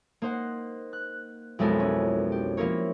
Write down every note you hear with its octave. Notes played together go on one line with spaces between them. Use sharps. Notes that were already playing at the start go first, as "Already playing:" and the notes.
A#3 D#4 C5 F#5
F#6
B1 F2 G#3 E4 A4 A#4
C#4
G4
F3 A#3 E4 A#4 C#5